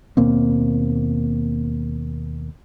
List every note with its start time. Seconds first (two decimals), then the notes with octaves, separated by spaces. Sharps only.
0.17 D#2 B2 A#3 C4